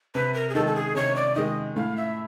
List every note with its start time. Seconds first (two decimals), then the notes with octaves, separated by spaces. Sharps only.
0.15 C3 B4
0.34 A#4
0.49 G#4
0.55 D#3 G#3 A4
0.67 A4
0.75 G#4
0.96 C3 C#5
1.16 D5
1.35 D#3 G#3 D#5
1.76 A2 F5
1.97 E5